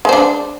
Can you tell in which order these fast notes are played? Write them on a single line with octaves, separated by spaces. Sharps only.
G#3 C5 D4